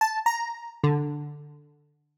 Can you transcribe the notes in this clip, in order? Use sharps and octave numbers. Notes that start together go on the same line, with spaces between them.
A5
A#5
D3